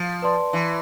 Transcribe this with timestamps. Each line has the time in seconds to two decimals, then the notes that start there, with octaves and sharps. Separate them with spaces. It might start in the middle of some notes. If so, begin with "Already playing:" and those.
Already playing: F3
0.22 B4 D5 A5 C6
0.53 E3